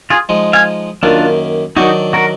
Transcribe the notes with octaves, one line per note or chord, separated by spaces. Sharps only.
F4 G#4
F3 G#3 D#4
F5 G#5
F#2 D#3 A#3 D4 F4
D#3 F#3 D4 D#4 F#4
F#4 A#4